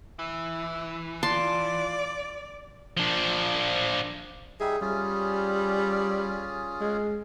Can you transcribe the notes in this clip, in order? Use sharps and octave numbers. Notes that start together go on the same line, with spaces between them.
E3 E4
F4 D5 A5 C6
F3 D4
G3 D#4 G#4 E5
G3 C#4 F4 G#4
G#3